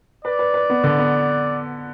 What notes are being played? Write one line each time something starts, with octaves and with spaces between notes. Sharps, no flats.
B4 D5
B4
B4
B3
D3
B3